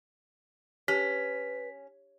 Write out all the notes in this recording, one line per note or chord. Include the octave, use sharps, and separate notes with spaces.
C#4 G4 B4 B6